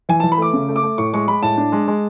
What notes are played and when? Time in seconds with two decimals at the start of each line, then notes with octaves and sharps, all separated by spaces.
0.09 E3 G#5
0.20 A5
0.24 E3
0.32 B5
0.38 A3 D6
0.53 C#3
0.69 A3
0.76 D6
0.83 A3
0.98 A2 C#6
1.13 G#3 C#6
1.28 G#3 B5
1.43 A2 A5
1.57 D4
1.72 G#3
1.88 G#3